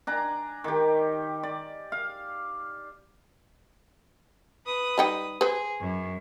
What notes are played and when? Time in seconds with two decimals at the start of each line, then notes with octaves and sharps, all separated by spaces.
0.07 D4 G#5 A#5
0.64 D#3 G4
1.43 D5
1.92 F5
4.66 B4 D#6
4.98 G3 D#4 G5
5.41 G#4 B4 C5
5.81 F#2